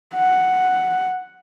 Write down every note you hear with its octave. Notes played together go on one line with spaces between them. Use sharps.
F#5